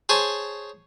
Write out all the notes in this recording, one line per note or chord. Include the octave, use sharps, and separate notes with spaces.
G#4 C5 C#5 G#5 A5